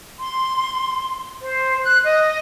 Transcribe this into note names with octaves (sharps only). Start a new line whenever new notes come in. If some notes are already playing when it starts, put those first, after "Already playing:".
C6
C5
F#6
D#5